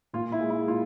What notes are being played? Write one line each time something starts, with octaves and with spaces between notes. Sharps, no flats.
A#2 F4
E4
G#3
E4
A#2 F4